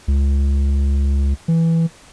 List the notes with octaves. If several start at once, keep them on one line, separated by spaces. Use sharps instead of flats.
C#2
E3